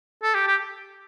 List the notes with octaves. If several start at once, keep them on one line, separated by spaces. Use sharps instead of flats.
A4
G4
G4